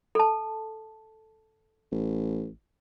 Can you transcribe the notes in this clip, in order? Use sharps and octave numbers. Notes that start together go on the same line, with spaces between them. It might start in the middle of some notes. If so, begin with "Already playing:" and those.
A4 A5
A1